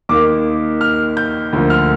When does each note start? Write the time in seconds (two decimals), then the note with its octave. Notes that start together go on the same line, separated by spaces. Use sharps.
0.09 D#2 D#3 A#3 D6
0.81 F6
1.17 G6
1.53 D2 D3 F3 A#3
1.70 F6